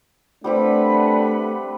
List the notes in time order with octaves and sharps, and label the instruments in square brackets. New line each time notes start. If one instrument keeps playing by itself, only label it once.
[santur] G3 C4 G4 [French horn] A3 [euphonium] D4 [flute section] B4 F#5 B5